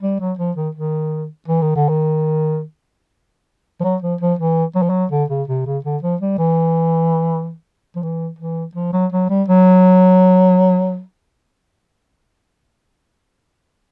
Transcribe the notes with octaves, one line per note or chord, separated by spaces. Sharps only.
G3
F#3
F3
D#3
D#3
E3
D#3
D3
D#3
F3
F#3
F3
F3
E3
F#3
F3
F#3
D3
C#3
C3
C#3
D3
F3
G3
E3
F3
E3
E3
F3
F#3
F#3
G3
F#3